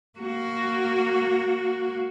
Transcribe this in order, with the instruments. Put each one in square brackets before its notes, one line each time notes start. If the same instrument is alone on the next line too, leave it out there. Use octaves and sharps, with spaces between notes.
[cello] A#3 F#4